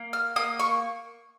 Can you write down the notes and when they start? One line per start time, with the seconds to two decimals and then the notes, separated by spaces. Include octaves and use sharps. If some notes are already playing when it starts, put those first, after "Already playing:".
Already playing: A#3
0.13 F6
0.36 A#3 D#6
0.60 C#6